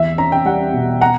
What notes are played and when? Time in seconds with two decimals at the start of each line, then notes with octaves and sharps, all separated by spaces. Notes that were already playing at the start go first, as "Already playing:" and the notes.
Already playing: E2 E5
0.18 C#4 A#5
0.32 G5
0.45 G3 F#5
0.73 B2
1.01 F#5 A#5